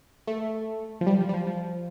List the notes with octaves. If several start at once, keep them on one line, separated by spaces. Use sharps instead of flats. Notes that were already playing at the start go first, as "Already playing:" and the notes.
A3
F3
G3
F3
G3
F3
F3